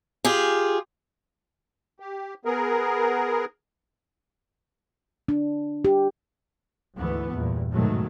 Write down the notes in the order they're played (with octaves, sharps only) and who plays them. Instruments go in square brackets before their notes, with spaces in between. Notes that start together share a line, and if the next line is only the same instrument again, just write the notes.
[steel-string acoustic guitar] F4 G4 G#4
[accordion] G4
B3 G#4 A#4
[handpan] D4
G4
[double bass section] D2 G#2 E3 A3 B3
E2 G2 A#2
G#2 B2 D#3 F#3 A3